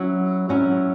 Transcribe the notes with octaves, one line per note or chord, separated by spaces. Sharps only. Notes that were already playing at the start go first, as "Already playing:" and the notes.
Already playing: F#3 C#4 E4
F#3 C#4 E4